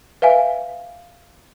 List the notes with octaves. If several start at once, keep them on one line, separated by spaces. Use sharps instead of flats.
B4 E5 F5 G#5